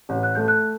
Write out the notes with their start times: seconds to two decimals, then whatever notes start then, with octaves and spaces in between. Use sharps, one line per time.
0.09 A1
0.23 F#6
0.35 A3 G6
0.48 F#6